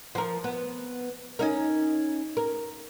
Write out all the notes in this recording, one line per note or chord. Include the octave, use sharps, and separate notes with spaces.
F3 A#4
B3
C#4 D#4 A#4
A#4